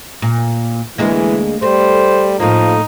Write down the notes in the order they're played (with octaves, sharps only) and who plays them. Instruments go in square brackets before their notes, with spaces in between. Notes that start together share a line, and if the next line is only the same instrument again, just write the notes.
[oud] A#2
[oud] D2 G#3 A#3 [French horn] E3
[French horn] G3 [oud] A3 [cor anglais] C5
[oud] A2 A#3 [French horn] F3 [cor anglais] D#4